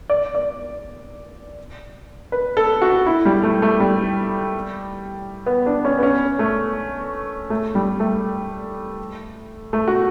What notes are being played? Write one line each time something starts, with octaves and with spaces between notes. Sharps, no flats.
D5
D5
B4
A4
F#4
E4
G3
A3
A3
G3
B3
D4
C#4
B3
C#4
A3
A3
G3
A3
A3
F#4